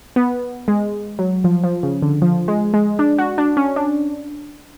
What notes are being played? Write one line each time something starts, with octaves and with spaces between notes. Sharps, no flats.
B3
G#3
F#3
F3
F3
C#3
D3
F3
G#3
G#3
D4
F#4
D4
C#4
D4